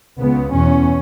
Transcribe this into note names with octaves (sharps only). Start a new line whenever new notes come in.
C#2 C#3 B3
E2 B2 C#4